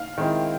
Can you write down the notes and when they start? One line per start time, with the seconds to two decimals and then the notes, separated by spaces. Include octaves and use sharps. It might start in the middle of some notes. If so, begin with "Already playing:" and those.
Already playing: F5
0.18 D#3 G#3 C4 E4